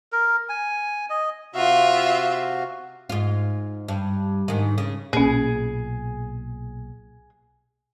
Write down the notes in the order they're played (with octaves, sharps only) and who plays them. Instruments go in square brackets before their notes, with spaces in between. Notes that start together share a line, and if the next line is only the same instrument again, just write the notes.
[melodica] A#4
G#5
D#5
[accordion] C3 F#4 F5 [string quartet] F4 E5
[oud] G#2 F4
G2
G#2 D#3
C#3
[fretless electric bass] B1 A#2 [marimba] A#3 C#4 [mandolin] G#4